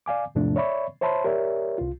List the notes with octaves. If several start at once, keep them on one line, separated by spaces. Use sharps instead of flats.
D5 F5 G#5 D6
E2 G#2 C3 F3 A3 D4
C#5 D5 E5 B5 C#6
C5 C#5 E5 A5 B5 C6
G4 A#4 C#5 D5 E5
C2 F4